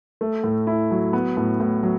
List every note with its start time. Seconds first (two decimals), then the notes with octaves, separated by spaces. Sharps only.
0.21 A3
0.44 A2
0.67 E4
0.91 F#3
1.13 B3
1.37 A2
1.60 A2
1.83 F#3